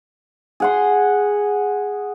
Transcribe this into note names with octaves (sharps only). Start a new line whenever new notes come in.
G#4 F#5 C6